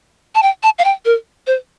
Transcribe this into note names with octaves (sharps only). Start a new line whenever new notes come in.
A5
G5
A5
F5
G5
A#4
C5